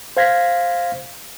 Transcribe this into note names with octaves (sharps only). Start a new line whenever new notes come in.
C5 F5 G#6 A#6 B6